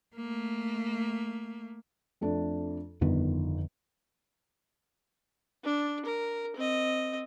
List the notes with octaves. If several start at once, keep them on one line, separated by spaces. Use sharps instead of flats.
A3 A#3
F2 A3 D4
G1 F2 D3 D#3 B3
D4
A#4
C4 D#5